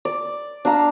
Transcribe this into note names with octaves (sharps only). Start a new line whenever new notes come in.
D5
D4 F5 A#5 E6